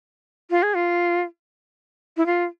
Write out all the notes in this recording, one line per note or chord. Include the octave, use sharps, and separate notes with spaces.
F4
G#4
F4
E4
F4